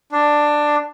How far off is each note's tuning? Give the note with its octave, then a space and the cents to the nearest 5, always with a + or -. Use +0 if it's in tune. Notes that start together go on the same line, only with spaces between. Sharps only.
D4 +10